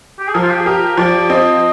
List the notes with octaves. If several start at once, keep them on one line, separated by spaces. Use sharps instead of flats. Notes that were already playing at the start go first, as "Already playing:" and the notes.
G4
G#4
F3 A#4
F4
G4
G#4
G4 A#4
F3 D5
C4 D#5